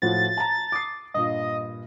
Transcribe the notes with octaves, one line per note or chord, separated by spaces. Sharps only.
A2 F3 F#4 A6
A5 A#5
D6 D#6 C7
G2 A#2 D#5